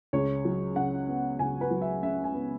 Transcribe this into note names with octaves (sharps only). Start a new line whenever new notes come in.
C#2 C#5
F#3
C#3 F#5
B3
C#2 G#5
B4
F#3
E5
C#3 E5
G#5
B3